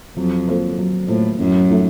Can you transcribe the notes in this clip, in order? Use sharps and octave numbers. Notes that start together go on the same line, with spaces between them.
F2 F#3
A#3 F4 A4 C5
F#3
A2 A#3 F4 A4 C5
F#2 A2
F3 A3 D#4 A4